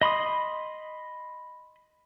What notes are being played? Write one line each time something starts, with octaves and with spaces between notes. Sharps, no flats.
D#5 B5 C6 D#6